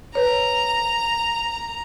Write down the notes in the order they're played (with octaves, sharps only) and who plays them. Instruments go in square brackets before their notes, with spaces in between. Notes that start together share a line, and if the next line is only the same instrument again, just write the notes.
[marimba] B4 C#5 [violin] A#5